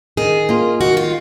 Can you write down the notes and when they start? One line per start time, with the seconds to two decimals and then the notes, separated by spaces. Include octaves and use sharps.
0.17 D#3 G#4
0.49 A#3 F4
0.81 D#3 F#4
0.97 F4